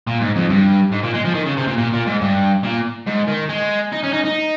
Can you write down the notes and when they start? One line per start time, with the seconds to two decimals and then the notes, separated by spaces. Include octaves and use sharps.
0.07 A#2
0.21 G#2
0.36 F2
0.49 G2
0.92 G#2
1.03 A#2
1.14 G#3
1.25 F3
1.35 D#3
1.46 C#3
1.57 C3
1.67 A#2
1.78 A#2
1.93 A#2
2.06 G#2
2.21 G2
2.64 A#2
3.07 G#2
3.28 D#3
3.49 G#3
3.93 D#4
4.04 C#4
4.13 D#4
4.25 D#4